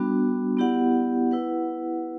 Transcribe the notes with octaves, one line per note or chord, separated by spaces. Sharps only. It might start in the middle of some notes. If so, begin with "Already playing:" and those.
Already playing: G3 B3 D4 F#4
B3 E4 G4 D5 F#5
E4 B4 F#5